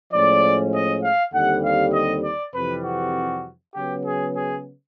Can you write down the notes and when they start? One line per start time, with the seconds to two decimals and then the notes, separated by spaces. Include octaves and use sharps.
0.13 A2 F3 G#3 C#4 D5
0.74 D#5
1.03 F5
1.34 D#2 D3 G3 C4 F#5
1.64 F5
1.93 D#5
2.24 D5
2.54 F2 C3 E3 G3 B4
2.84 F#4
3.75 C#3 F#3 B3 G4
4.06 G#4
4.36 G#4